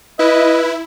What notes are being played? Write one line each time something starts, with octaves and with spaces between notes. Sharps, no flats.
E4 B4 D#5